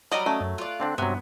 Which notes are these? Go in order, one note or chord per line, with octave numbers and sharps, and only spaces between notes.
F#3 G3 D5 D#5 A#5 B5
F#3 A3 C#4
F#2
F4 D5 F#6
D3 C4 D4
G2 C3 F#3 B3